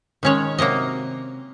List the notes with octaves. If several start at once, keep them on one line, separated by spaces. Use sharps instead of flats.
D#3 G#3 C#4 C#5
C3 F#3 A#3 D#5